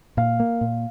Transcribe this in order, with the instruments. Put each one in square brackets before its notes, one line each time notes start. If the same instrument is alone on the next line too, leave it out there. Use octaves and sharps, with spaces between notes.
[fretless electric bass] A#2 [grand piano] F5
[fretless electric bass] A#3
A#2